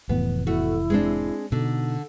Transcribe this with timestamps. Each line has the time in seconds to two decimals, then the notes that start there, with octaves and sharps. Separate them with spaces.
0.09 F1 A2 E3 B3
0.47 A3 E4 F#4
0.90 G#3 C4 D4
1.52 B2 D3 D#4